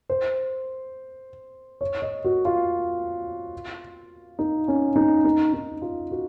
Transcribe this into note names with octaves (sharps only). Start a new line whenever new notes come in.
C5
C#5
D#5
F#4
F4
D#4
C#4
D#4
D#4
D#4
F4
F#4